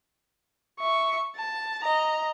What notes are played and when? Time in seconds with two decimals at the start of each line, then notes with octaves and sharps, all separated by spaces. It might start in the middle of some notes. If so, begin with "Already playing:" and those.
0.79 E5 C#6
1.36 A5
1.84 D#5 A#5